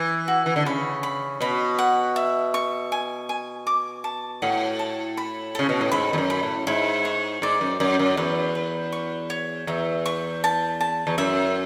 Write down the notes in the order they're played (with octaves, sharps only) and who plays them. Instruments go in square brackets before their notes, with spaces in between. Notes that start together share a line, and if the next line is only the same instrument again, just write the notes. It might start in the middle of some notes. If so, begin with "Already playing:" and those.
Already playing: [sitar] E3
[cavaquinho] F#4
[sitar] E3
D3
[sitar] C#3 [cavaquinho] B5
[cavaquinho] B5
[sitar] B2 [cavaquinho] B5
[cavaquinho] F#5
E5
C#6
G#5
G#5
D6
A5
[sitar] A2 [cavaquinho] F#5
[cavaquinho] A5
B5
[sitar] C#3 [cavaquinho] A4
[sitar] B2
A2
[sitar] G#2 [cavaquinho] B5
[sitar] E2
F#2
[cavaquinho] B5
[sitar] A2
[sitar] G#2 [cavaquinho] E4
[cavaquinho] C#5
[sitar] G#2 [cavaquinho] D5
[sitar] F#2
[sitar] F#2 [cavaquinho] D5
[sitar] F#2
[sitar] E2 [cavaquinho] B4
[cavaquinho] B4
C#6
C#5
[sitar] E2 [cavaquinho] E5
[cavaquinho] C#6
A5
A5
[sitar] E2
[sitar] F#2 [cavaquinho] E5